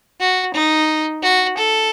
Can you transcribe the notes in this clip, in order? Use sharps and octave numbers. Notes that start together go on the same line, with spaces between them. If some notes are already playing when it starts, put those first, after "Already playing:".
F#4
D#4
F#4
A4